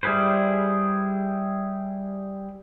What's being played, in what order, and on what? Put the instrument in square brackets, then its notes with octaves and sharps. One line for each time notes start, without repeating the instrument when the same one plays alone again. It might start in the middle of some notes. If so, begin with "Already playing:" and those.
[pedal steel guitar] G3 E4 G#4 B4 C5